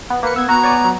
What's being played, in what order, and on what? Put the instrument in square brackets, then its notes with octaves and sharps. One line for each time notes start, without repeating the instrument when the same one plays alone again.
[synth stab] B3
[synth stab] A#3 C#7 [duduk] B4
[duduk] B3 [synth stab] E6 G#6
[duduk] B3 [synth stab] F#4 [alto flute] A#5
[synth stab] C#5 D5 G#5
F#3